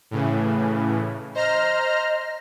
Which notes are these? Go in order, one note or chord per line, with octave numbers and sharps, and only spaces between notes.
A2 C#3 E3
C5 D#5 A#5 F6